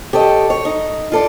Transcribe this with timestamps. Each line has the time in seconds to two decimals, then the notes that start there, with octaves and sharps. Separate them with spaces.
0.13 G4 A4 C#5 D#5
0.50 C#5
0.65 D#4
1.12 F4 A4 D5